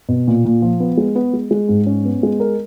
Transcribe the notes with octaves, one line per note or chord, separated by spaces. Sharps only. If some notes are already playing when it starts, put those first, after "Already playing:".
B2
A#2
A#2
F3
B3
G#3
B3
G#3
G#3
G#2
C#4
B3
G#3
A#4